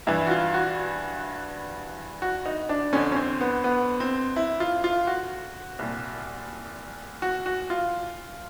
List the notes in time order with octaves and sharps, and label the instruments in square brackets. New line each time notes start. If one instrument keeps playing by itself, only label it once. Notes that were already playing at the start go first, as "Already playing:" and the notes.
[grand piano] G2 E3 E4
F#4
F4
F#4
F#4
D#4
D4
F2 D3 C#4
C#4
C4
B3
B3
C4
E4
F4
F4
F#4
C2 A#2
F#4
F#4
F4